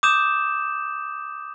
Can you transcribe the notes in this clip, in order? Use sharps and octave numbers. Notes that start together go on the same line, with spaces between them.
D6 D#6 G6 E7